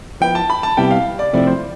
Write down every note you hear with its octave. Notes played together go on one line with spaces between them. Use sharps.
F3 B3 E4 B4 G5
A5
B5
A5
C3 G3 B3 E4 G4 G5
F5
D5
C3 F3 A3 C4 E4 D5
C5